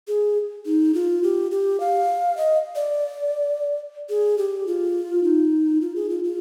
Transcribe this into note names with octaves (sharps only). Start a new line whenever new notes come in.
G#4
D#4
F4
G4
G4
F5
D#5
D5
G#4
G4
F4
D#4
F4
G#4
F4
F4